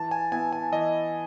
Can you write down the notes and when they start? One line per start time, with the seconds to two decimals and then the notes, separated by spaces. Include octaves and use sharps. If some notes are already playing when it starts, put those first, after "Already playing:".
Already playing: E3 A5
0.11 G#5
0.32 B3 E4 G#5
0.53 G#5
0.72 E3 D#5